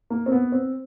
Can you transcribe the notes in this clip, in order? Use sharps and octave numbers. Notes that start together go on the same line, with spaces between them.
A#3
C4
B3
C4